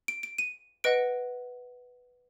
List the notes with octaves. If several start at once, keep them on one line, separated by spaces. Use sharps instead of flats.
D7
D7
D#7
B4 D#5 F#5 D7